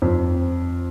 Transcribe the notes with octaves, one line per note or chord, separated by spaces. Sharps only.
F2